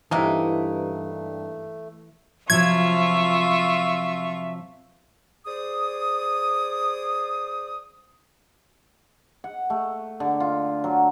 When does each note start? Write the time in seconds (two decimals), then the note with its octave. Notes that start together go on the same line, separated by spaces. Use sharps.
0.11 G2 C3 E3 A3 A#3 D#4 E4
2.50 C3 F3 F#3 F4 E5 C#6 G#6
5.46 G#4 C5 D5 D#6
9.44 F#5
9.70 A3
10.20 D3
10.40 F4
10.84 F#3